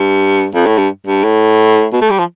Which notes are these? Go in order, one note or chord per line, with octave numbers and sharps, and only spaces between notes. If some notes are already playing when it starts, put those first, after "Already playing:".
Already playing: G2
F2
A2
G2
G2
A2
B2
A3
G3
F3